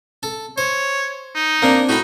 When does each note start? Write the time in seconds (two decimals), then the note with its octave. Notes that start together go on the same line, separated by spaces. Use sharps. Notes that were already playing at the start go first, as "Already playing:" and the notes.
0.23 A4
0.58 C5 C#5
1.35 D#4
1.62 A#3 C4 D4
1.89 A2 D#4 F#4 B5